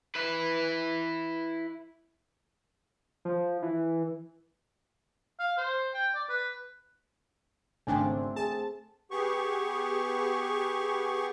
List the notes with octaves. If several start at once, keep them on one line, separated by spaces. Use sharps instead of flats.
E4 B4
F3
E3
F5
C5
G5
D5
B4
G#1 C#3 A3 C4 D4 C5 G5 G#5
G#4 A5
B3 G4 G#4 C#6